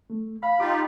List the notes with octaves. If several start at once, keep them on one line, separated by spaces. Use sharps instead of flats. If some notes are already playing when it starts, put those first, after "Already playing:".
A3
F5 B5
D#4 F4 G4 D6